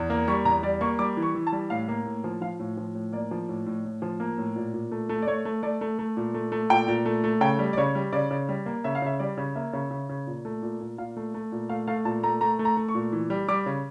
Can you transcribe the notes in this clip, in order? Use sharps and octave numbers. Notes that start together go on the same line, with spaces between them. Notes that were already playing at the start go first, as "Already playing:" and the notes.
Already playing: E2
A#3
G3 C#6
E2 A#5
G3 D5
A#3 C#6
G3 D6
E3
C#6
E3
A5
G3
A2 F5
A#3
A2
F3
F3 F5
A2
F3
A2
A#3 D5
F3
A2
A2
A2
F3
A#3
A2
A#2
A#2
A3
A3
D5
A3 C#5
A3
A3 D5
A3
A3
A#2
A3
A3
A#2 G5
A#2
A3
A3
C#3 G5
G3
D5
C#3 C#5
G3
C#3 D5
C#3
G3
A#3
C#3 E5
F5
C#3 E5
G3 D5
C#3
A#3 E5
C#3
C#3
C#3
A#2
A3
A#2
A#2
A#2 F5
A3
A3
A#2
A3 F5
A3 F5
A#2 A5
A3 A#5
A3 A#5
A3
A#5
A3
C#6
A#2
E3
G3
G3 D6
C#3